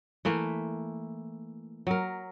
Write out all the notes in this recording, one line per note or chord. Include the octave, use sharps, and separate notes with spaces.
E3 A3 A#3
F#3 A#4